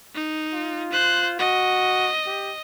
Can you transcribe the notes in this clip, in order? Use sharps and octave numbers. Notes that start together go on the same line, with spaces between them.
D#4
F4
C5 F#6
F#4 D#5
G4